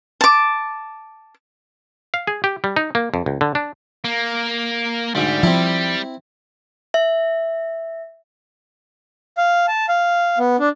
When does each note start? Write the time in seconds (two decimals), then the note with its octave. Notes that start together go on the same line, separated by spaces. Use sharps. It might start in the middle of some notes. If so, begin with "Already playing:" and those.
0.21 A5 D6
2.14 F5
2.27 G#4
2.44 G4
2.64 G3
2.76 D#4
2.95 A#3
3.14 F2
3.26 C#2
3.41 D3
3.55 D4
4.04 A#3
5.15 D2 G#2 G3
5.43 F3 C4 E4
6.94 E5
9.38 F5
9.68 A5
9.89 F5
10.38 B3
10.60 D4